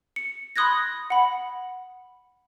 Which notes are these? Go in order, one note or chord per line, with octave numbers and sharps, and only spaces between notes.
C#7
B5 C6 D#6 F#6 G#6 A#6
F#5 B5